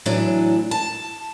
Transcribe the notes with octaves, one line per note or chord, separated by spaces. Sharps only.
A2 E3 F#3 D4
A5